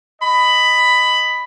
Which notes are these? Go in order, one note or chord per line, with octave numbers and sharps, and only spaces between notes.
D#5 B5